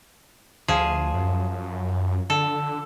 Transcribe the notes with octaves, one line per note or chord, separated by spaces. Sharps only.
D2 F3 G#4
F#2
D3 A4